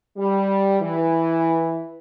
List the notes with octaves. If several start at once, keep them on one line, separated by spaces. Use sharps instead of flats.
G3
E3